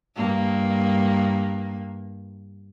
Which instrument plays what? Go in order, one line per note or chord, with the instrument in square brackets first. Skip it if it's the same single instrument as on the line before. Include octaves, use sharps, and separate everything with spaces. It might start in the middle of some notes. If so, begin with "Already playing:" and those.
[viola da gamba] G2 A#3